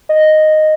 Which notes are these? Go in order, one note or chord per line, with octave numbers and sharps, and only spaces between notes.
D#5